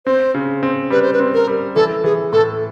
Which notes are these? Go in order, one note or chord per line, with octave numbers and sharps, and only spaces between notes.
C4 C5
C#3
C4
G3 B4
C5
B4
C4
A#4
G3
E3 A4
E3 G#4
A2 A4